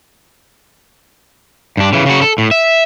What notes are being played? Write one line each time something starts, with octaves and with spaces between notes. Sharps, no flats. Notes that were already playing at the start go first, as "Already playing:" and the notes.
G2 D4
C#3 E3
C#3 F#4
A4
A2
E5